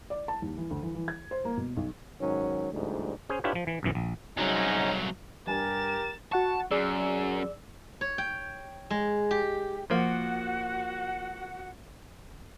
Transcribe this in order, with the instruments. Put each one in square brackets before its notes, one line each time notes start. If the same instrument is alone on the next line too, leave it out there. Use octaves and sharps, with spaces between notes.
[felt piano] D5
A5
D#2
E3
D2
E3
E3
G#6
C5
A#3
B2
B1
[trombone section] G#2 D#3 F#3 C#4
A1 D2 G#2 G3
[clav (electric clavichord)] C#4 G#4 C5
D4 E4 F4 G4 B4 C#5
F3
E3
B1 F#2 E3
A#1
[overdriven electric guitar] C2 F#3 [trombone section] G#2 C#4 D#4
[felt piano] G2 G3 G#5 [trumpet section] G4 A#4 [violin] A6 E7
[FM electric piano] F#4 F#5 C#6 [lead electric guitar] A5
[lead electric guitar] F#2 [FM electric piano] G#4 D5 E6
[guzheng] C#5
G5
G#3
G4
[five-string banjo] F3 A#3 [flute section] F#4 F#5